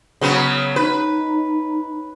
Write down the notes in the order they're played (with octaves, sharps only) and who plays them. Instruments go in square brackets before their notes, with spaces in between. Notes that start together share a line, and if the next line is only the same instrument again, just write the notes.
[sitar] C#3 F#3 B3
[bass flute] D#4 [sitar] B4